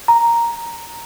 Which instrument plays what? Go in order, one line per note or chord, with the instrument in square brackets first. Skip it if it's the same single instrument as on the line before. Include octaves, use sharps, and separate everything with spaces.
[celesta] A#5